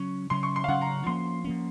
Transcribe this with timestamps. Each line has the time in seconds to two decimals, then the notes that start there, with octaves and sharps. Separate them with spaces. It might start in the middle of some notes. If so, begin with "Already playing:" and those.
Already playing: C#3 F#3 C#4 C#6
0.30 C#3 F#3 C#4 C6
0.43 C#6
0.56 C6
0.64 F5
0.68 C#3 F#3 C#4 F#5
0.82 A#5
1.06 F3 A#3 C#4 C6
1.44 F3 A#3 C#4